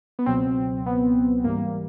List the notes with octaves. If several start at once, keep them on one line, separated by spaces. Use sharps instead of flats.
B3
C#2 B2 F#3 C4
B3
G#2 E3 G3 A#3